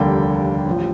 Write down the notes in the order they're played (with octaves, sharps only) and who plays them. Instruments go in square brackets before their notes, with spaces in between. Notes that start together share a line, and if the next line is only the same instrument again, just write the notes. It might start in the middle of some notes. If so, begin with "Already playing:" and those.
Already playing: [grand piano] F1 D#2 D3 G3 A#3 G5
A1 F3